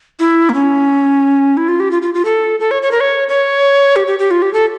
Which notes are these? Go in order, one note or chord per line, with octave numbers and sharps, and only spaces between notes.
E4
A#3
C#4
E4
F4
G4
F4
F4
F4
A4
A4
C#5
C#5
A#4
C#5
C#5
G4
G4
G4
F4
G4
A4